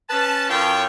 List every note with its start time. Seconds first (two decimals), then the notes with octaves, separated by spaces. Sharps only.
0.10 C#4 B4 A5
0.50 F#2 F4 A4 C#5 G5